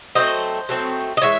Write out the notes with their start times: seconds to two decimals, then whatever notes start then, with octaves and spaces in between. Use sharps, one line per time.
0.15 F#3 A3 C4 C5 D#5
0.69 F#3 A3 C4
1.17 D#5
1.22 E3 G#3 C#5 E5